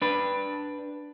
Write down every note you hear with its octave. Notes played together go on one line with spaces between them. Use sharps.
D4 B4